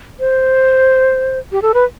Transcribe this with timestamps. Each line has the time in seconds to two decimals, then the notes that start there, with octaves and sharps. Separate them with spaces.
0.20 C5
1.52 G4
1.62 A4
1.74 B4